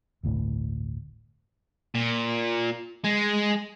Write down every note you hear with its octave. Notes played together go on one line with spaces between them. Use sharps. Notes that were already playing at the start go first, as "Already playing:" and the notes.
G1 D2 A2
A#2
G#3